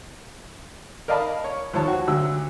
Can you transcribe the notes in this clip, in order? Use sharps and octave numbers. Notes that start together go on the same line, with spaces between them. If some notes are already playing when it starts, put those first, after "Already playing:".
A#4 D5 D#5 F5 A5 B5
C#5
D#2 F3 C#5 A5
F#4
D2 F#3 E6